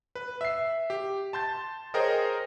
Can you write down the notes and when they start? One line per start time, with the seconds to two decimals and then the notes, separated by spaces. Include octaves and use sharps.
0.15 B4
0.41 E5 C7
0.90 G4
1.33 A5 C6 G6 A6
1.94 G#4 A#4 C5 C#5 D#5 G5